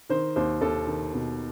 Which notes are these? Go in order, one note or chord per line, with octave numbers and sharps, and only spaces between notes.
D#3 C5
D#2 C5
D#2 A4
D#3
B2